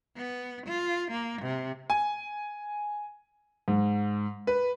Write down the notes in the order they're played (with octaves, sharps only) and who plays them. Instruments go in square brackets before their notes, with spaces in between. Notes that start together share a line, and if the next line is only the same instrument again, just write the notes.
[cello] B3
F4
A#3
C3
[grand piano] G#5
G#2
B4